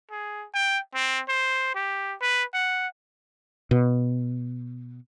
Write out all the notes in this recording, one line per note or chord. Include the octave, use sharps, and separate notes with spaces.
G#4
G5
C4
C5
G4
B4
F#5
B2